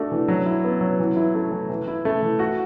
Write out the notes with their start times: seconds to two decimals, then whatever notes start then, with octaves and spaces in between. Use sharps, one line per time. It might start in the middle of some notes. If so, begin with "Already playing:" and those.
Already playing: A3 D4 F#4
0.12 E3
0.28 F#3
0.46 E4
0.64 B3
0.81 F#3
1.00 E3
1.16 E4
1.35 A3
1.51 E3
1.69 E3
1.88 E4
2.05 A3
2.22 E3
2.39 F#4